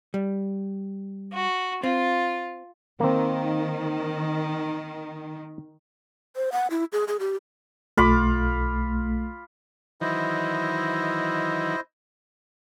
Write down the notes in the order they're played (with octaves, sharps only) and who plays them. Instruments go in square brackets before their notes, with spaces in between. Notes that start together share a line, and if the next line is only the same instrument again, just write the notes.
[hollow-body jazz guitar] G3
[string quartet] F#4
[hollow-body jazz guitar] C4 [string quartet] F4
[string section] D#3 [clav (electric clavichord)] A#3 C4
[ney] C5
F#5
E4
G#4
G#4
G4
[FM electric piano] B1 A3 [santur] F4 B5 D6
[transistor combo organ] D#3 E3 F#3 [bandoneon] E4 C5 D#5